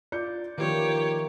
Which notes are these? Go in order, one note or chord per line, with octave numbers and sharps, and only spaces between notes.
F4 D5 G6 C#7
D#3 F3 A#3 F4 G4 B4 C#5 E5